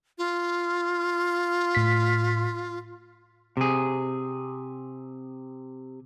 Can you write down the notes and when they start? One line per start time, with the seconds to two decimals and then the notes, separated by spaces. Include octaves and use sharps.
0.18 F4
1.75 A2 B6
3.57 C3 G#4